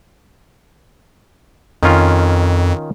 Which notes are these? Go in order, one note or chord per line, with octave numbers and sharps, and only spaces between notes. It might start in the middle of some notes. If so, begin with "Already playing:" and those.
F2 D#3 C#4 F4